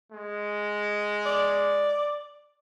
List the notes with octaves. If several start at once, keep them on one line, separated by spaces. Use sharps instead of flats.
G#3
D5